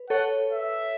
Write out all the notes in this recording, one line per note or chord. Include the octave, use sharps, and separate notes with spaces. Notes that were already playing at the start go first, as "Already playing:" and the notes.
Already playing: B4
A4 C#5 F#5
E5